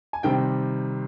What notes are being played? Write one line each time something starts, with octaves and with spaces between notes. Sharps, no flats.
G#5
C3 D#3 G3 C4 G5